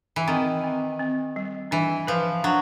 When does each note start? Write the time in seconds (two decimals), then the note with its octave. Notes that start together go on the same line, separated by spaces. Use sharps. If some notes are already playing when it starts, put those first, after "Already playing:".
0.16 E3
0.28 D#3 C4
0.64 C4
1.00 C4
1.36 G3
1.71 E3 D4
2.07 F3 B4
2.44 F#3 D4